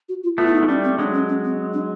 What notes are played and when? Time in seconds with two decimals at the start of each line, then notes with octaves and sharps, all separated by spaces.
0.09 F#4
0.23 F4
0.38 A3 B3 F4
0.47 E4
0.54 D#4
0.63 G#3
0.68 G3 A3 C#4
0.84 C4
0.99 F#3 G#3 D4
1.13 C#4
1.29 C#4
1.44 C4
1.74 D4